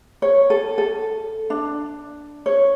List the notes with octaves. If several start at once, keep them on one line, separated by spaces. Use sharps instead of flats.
C#5
A4
A4
D4
C#5